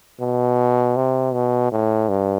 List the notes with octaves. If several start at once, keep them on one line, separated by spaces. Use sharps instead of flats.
B2
C3
B2
A2
G2